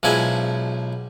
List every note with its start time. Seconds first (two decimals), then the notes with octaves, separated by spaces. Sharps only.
0.03 B1 F3 G#3 E4 G#5